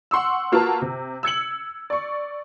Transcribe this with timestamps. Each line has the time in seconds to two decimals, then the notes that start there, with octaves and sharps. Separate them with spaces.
0.11 F#5 C6 C#6 E6
0.52 A#3 F4 F#4 A#4 B4 A5
0.82 C3
1.23 E6 G#6 C#7 F#7
1.90 D5 C#6